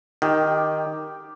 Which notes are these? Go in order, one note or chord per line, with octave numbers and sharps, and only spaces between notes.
D#3 G4